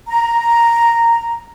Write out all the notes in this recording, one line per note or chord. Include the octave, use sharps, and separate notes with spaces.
A#5